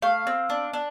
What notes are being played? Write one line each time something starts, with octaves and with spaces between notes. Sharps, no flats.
A3 F5
C4
D4
D4